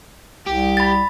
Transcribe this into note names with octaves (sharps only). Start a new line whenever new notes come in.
C2 G4
B5 A6